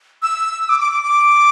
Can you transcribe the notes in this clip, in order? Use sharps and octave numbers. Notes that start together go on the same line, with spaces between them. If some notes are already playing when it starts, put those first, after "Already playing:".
E6
D6
D6
D6
D6